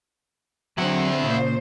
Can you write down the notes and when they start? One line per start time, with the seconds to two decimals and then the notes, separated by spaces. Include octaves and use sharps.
0.78 D3 F#3 C4 E4 F#5
1.24 A#2 C#3 C5